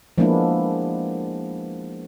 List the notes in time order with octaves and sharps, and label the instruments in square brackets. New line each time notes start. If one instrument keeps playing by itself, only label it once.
[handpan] F3 G#3 A#3 B3 D4 E4